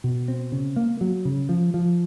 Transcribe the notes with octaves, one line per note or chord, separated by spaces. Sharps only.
B2
C4
C#3
A#3
F#3
C#3
F3
F3